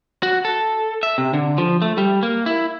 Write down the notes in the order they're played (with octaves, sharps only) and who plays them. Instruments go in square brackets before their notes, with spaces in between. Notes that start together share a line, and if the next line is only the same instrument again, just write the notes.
[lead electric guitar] F#4
A4
E5
C3
D3
F3
A3
G3
A#3
E4